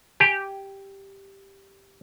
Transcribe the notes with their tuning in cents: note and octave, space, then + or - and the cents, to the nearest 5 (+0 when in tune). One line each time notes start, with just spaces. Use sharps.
G4 +0 G#5 +0